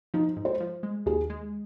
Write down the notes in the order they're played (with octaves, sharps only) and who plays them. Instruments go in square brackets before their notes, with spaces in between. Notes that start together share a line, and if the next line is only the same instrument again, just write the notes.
[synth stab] F3 [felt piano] D#4
[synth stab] G#2
[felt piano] C5
[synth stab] F3
G#3
[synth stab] D#2 [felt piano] G#4
[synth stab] G#3